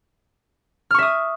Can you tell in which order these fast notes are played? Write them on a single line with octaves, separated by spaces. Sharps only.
F6 C#6 E5 D#6